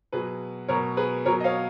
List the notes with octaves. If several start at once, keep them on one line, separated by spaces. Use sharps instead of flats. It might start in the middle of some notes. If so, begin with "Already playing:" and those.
B2 F#3 G#4 B4
B2 F#3 A#4 C#5
G#4 B4
B2 F#3 A#4 C#5
D#5
C#5 F5